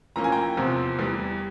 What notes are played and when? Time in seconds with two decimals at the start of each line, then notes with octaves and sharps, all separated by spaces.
0.16 F2 E3 A#3 C#4 A#5
0.24 G#5
0.32 G5 A#5
0.57 E2 C3 F3 C4
0.99 E2 E3 G3